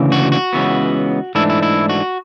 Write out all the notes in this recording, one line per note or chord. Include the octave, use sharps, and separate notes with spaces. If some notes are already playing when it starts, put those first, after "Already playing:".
Already playing: D2 C#3 E3
F#4
F#4
C#2 C#3 E3 B3
G#2 E3 A3 D4 E4
E4
E4
F#4